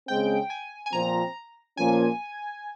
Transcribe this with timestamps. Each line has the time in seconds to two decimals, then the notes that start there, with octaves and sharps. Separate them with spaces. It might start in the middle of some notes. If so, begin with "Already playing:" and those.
0.08 C#3 G#3 C4 G5
0.50 G#5
0.86 G#5
0.93 A#2 F3 C4 A#5
1.77 A#2 F3 A#3 C#4 G#5